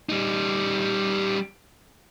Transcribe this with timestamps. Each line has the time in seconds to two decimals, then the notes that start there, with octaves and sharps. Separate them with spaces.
0.09 G3 D#4